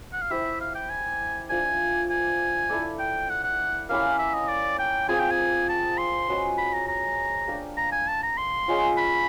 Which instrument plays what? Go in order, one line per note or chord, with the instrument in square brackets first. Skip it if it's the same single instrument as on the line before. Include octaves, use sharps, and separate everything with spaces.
[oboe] F#5
F5
[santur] E4 G4 C5 [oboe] E5
[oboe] F5
G5
G#5
[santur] F3 A3 D4 [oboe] G#5
[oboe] G#5
[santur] E4 A4 D5
[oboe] G5
F#5
F#5
[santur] A#3 C#4 E4 G4 [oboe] F5
[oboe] E5
D#5
D5
G5
[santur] C4 F4 G#4 C5 [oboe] G#5
[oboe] G5
G#5
A5
C6
[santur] C#4 F#4 B4 D#5
[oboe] B5
A#5
A#5
[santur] A#3 D4 G4 A#4
[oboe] A#5
G#5
A5
A#5
C6
[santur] G#3 C#4 F4
[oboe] B5